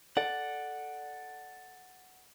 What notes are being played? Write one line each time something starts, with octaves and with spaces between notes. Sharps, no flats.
A4 D5 F#5